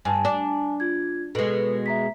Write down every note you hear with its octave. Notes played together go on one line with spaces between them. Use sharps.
G2 G#5 A5
D4
F4 G#6
B2 G#3 A4 B4
E5 A#5 B6